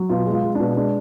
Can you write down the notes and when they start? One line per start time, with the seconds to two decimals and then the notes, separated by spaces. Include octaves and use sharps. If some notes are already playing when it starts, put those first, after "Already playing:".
Already playing: F#3
0.09 B2 F4
0.26 G#3
0.32 F4
0.44 G#3
0.55 B2 D4
0.76 G#3 D4